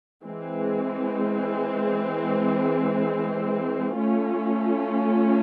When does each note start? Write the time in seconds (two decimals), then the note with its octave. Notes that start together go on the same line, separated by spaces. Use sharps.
0.25 E3 G#3 C4
3.97 A3 C#4 F4